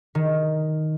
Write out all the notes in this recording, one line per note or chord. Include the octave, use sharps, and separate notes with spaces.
D#3